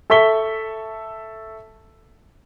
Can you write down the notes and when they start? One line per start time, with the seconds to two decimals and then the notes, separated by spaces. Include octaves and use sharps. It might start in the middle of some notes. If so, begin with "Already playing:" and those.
0.10 A4 E5 C#6 B6 G7